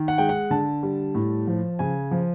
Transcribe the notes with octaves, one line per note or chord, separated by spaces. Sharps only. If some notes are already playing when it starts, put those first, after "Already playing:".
Already playing: D#3
F#5
G#3 G5
F#5
D3 A5
G3
A2
F3
C#3 G#5
F3